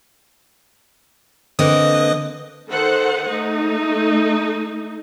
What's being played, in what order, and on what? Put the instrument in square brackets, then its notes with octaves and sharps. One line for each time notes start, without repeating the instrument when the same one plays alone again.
[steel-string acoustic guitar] D3 A#3 C4 [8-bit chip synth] B4 D#5 D#6
[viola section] D#3 A4 C5 F#5
A3 D#4